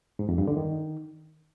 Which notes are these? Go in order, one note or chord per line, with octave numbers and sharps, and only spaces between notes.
G#2
F2
G2
D3
D#3